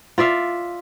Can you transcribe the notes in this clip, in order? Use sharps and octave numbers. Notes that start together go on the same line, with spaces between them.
F4 D5 E5 F5